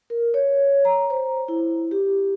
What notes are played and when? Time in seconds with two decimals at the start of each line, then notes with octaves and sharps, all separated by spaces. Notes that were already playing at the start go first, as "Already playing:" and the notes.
0.10 A#4
0.34 C#5
0.85 A#5
1.10 C5
1.48 E4
1.91 G4